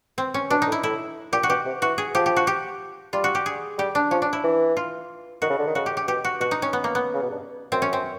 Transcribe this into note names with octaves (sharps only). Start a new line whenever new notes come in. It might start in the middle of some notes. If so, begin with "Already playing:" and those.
C4
C#4
B2 D4
A2 D#4
E4
A2 E4
A#2 G4
F#4
B2 G4
C3
E3 F#4
G#4
F3 G4
G4
F#4
G4
G3 F4
F#4
G4
G#4
G3 G4
D4
F3 C#4
D4
E4
E3
F4
D#3 F#4
C#3
D3
D#3
C#3 F#4
G4
G4
B2 G4
F#4
B2 F#4
D#4
C#4
B3
A#3
B3
C#3
B2
G2
F#2 C4
C#4
C4